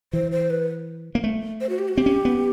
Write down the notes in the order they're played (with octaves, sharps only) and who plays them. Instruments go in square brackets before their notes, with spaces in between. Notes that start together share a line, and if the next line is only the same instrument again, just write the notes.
[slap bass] E3 [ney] C5
[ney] C5
B4
[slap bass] A#3
A3
[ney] C5
F#4
G4
F#4
[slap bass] C4 [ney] G4
[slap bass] C#4
B3